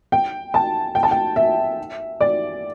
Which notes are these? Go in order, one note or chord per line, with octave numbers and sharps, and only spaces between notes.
G5
A5
G5
A5
G5
E5
D5